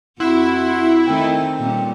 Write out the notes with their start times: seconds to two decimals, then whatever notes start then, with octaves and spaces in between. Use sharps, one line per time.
0.20 F2 E4 F#4 F#5 C6
1.06 D#3 A3 C4 D#4
1.58 A#2 G3 C#4